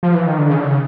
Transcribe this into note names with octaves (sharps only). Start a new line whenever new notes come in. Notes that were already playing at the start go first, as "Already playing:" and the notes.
F3
E3
D#3
D3
C#3
D3
C#3